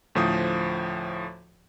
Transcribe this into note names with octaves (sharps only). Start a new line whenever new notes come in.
D2 A2 F3 C5 D#6